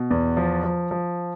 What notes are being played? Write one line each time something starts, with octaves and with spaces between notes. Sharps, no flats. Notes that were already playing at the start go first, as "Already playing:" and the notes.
Already playing: B2
E2
F3
F3
F3